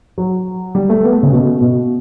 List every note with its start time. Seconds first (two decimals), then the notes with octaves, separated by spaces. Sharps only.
0.18 F#3
0.75 G3
0.90 A3
1.04 B3
1.13 A3
1.23 C#3
1.32 B2
1.61 B2